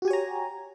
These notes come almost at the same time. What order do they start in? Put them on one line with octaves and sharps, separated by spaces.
F#4 G4 G#5 C#5 A#5